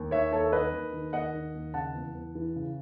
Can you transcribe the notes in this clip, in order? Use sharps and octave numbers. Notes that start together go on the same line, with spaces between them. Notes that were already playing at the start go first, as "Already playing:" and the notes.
Already playing: D#2
D#3 C#5 E5
D#2 A4 C#5
D#3 B4 D#5
D#2
D#3
D#2 D#5 F#5
D#3
D#2
C#3 F#5 A5
E2
E2
E3
C#3